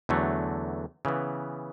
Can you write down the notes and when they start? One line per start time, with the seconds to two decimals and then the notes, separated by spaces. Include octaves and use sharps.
0.09 E2 D3 F#3 A3
1.05 C#3 E3 B3